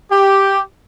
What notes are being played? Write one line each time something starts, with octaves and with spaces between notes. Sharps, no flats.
G4